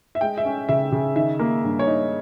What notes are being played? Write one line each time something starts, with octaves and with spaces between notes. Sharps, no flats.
E5
G#3 G5
E5
C#4
C#3 E5
C#3
D#3 E5
A#3
G2
C#5
D#4